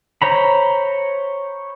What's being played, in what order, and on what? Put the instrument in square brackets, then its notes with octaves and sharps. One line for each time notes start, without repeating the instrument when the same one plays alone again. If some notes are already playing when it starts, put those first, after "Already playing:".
[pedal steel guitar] C5 C#5 A#5 B5